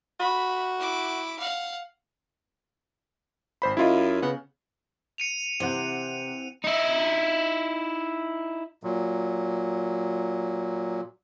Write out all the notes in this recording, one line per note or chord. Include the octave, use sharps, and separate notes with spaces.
F#4 B5
E4 D6
F5 F#5
G#1 C5 B5
F#2 E4 F4 D#5
C#3 B3
C#7 D#7 F7
C3 E3 C4 F#5
D#4 E4
A#2 F#3